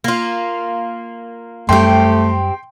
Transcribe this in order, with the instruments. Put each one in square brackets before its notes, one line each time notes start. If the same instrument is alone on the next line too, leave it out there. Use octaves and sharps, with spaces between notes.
[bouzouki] A#3 F4
[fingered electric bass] F#2 G3 [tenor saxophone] A3 [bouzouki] C4 G4 [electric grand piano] G5 C6